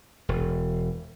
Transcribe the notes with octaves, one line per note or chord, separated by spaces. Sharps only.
E1